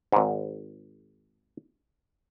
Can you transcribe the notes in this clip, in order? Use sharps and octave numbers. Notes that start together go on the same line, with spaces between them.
G#1 G#2